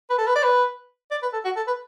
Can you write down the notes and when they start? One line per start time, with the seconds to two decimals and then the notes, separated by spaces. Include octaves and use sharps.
0.10 B4
0.18 A4
0.26 B4
0.35 D5
0.43 B4
1.11 D5
1.22 B4
1.33 A4
1.44 F#4
1.56 A4
1.67 B4